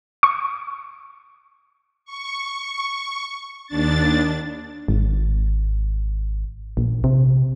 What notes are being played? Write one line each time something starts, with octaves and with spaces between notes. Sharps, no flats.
C#6
C#6
D#2 D4 A6
G#1
A#1
C3